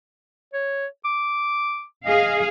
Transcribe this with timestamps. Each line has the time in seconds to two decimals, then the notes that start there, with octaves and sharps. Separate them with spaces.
0.54 C#5
1.05 D6
2.05 G#4 D#5 F5